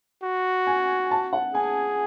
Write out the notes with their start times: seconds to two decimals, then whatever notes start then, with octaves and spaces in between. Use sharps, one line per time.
0.23 F#4
0.67 G#5
1.11 A5
1.33 F#5
1.54 G#4 G#5